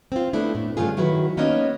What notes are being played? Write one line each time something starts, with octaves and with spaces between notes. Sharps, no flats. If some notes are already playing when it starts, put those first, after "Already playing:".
C4 F4
A3 B3 D4 E4
A2
G2 C#3 A3 F4 G#4
D#3 F#3 E4 F#4 B4
A#3 B3 C#4 D#4 C#5 D#5